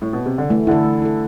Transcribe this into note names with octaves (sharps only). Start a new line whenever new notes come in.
A2
B2
C3
D3
E3 A3
D3 E4 A4
A3
E4 A4